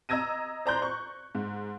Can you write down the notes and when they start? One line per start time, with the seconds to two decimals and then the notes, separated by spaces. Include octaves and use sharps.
0.09 D#5 A#5 E6 G#6 A#6 D#7
0.66 C5 D5 A#5 C6 F#6 G6
0.82 C#6
1.35 G#2